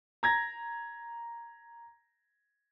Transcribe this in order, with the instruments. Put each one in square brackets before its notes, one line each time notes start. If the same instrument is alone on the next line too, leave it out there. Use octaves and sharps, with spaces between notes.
[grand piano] A#5 G#6 A#6